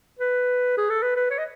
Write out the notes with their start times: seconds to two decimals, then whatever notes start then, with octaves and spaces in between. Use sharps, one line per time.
0.19 B4
0.77 G#4
0.90 A4
1.02 B4
1.16 B4
1.31 C#5
1.38 D#5